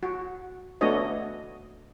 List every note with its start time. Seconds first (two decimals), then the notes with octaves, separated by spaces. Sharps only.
0.03 F#4
0.81 A3 B3 D4 F#4 C#5 D#5